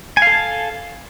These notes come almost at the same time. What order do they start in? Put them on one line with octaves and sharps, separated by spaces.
G#5 F5 A4 A5